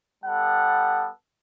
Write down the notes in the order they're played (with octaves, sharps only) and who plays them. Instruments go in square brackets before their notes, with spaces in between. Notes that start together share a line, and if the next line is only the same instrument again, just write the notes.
[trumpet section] G3 B3 A4 F#5 A5